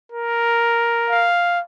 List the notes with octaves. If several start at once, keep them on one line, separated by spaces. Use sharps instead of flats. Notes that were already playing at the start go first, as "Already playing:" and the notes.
A#4
F5